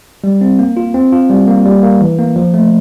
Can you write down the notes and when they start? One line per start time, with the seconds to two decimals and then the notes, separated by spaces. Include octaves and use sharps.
0.24 G3
0.41 C4
0.59 A#3
0.77 F4
0.94 C4
1.12 F4
1.30 G3
1.48 A#3
1.65 G3
1.83 A#3
2.01 E3
2.19 A#3
2.36 F3
2.54 A3